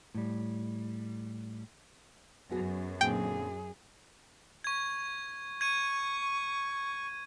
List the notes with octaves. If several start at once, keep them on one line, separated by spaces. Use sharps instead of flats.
A2 G3
F#2 B3 F#4 G#4
A#2 D3 C4 G#4 G5
C#6 G#6
C#6 G#6 D#7